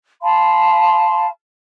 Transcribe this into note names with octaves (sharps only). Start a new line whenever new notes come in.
F5 A5 B5 C6